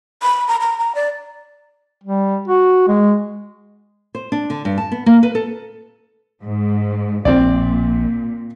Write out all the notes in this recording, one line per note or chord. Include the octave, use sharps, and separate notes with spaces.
B5
A#5
A#5
A#5
D5
G3
F#4
G#3
C5
D4
D3
G2
A5
B3
A#3
B4
A4
G#2
A#1 A#2 C4 D5